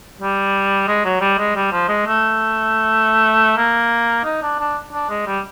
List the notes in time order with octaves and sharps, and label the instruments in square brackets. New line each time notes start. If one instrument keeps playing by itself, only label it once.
[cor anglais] G3
G#3
F#3
G3
G#3
G3
F3
G#3
A3
A#3
D#4
D4
D4
D4
G#3
G3